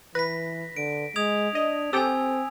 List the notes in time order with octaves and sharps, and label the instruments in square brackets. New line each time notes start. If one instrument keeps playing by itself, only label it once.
[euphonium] E3 [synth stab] B4 [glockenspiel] A#6 B6
[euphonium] D3 [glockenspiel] D7
[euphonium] G#3 [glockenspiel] D#6 G#6 F7
[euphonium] D4 [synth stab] D#5
[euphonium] C4 [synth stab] G4 A4 G5 [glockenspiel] G#5 E6